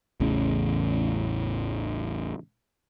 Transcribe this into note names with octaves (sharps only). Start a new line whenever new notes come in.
A1 E2 A2 C#3